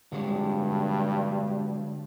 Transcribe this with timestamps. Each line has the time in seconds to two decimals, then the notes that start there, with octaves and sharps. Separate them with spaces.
0.12 G2 D3 F#3 G#3